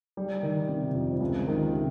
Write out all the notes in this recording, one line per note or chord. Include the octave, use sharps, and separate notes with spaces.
G3
D#3
C3
F2
C#2
D#3
C3